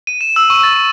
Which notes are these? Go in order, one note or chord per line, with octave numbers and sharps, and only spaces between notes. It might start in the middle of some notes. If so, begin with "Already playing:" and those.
D#7
E7
E6
C#6
A6
D#7